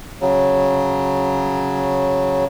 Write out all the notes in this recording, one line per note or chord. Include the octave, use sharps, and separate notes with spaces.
C#3 F#3